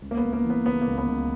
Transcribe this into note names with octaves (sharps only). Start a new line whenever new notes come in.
C#2
A#3
B3
C#2
A#3
E3
B3
C#3 B3
A#3
C#2
B3
C#2